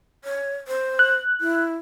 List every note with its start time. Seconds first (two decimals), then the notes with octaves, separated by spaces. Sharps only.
0.24 C#5
0.68 C5
0.99 F#6
1.41 E4